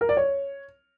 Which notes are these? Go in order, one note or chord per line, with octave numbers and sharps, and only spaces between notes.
A#4
D5
C#5